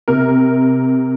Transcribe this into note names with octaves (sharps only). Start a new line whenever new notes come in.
C3 A#4